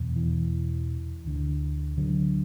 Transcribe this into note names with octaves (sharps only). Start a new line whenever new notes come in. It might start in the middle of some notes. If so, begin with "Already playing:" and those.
Already playing: E2 B2
E3
D2 D3
D3 F#3